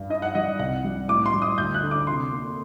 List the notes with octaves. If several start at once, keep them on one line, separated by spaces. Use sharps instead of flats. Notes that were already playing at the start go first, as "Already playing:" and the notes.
Already playing: G2
D#4 D#5
F#5
G3 D#5
C2 F#5
G3
A2 D6
C6
G3
D#6
D2 G6
F#6
D3
D6
C3 C6
A#3